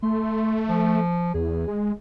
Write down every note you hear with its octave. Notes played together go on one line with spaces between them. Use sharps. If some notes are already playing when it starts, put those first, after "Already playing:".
A3 C6
F3
E2 G#4
G#3